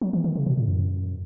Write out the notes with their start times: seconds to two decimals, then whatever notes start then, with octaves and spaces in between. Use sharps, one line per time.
0.01 F#3
0.13 E3
0.24 D#3
0.35 C#3
0.46 B2
0.57 A2
0.68 F#2